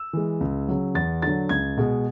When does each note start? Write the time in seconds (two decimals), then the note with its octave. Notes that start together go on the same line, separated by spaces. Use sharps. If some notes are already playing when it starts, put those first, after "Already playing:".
Already playing: E6
0.13 E3 G#3
0.41 C#2
0.68 C#3 F#3
0.95 E2 A6
1.22 D3 F#3 A6
1.49 C#2 G#6
1.77 B2 G#3